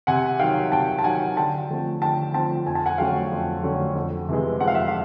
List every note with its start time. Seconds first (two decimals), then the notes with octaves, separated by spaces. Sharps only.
0.07 C3 F#5 G#5
0.39 D#3 F#3 F5 G5
0.72 C3 G5 A5
0.99 A5
1.04 D#3 F#3 F#5 G#5
1.37 D3 G5 A5
1.69 F3 A3 C4
2.02 D3 G5 A5
2.34 F3 A3 C4 G5 A5
2.66 F2 G#5
2.75 A5
2.86 F#5 G#5
2.98 D3 F#3 A3 C#4 F5 G5
3.32 F2
3.63 D3 F#3 A3 C#4
3.95 F2
4.29 C3 E3 G#3
4.60 F2 F#5
4.68 F5
4.75 E5 F#5
4.88 F5